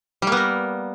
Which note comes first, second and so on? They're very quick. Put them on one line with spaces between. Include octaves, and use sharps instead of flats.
G3 A#3 B3 A#4